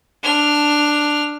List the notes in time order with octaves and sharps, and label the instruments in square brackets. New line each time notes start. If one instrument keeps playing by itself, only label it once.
[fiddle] D4 F6